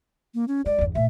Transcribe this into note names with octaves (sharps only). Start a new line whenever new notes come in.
A#3
C#4
G#3 D5
G1 E2
A#2 A3 E5